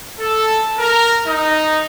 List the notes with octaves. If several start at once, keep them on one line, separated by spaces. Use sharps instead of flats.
A4
A#4
D#4